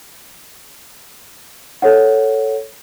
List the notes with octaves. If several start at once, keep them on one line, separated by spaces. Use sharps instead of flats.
A4 C#5 F#5